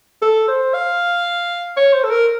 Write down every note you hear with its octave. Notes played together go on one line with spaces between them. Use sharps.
A4
C5
F5
C#5
C5
A4
A#4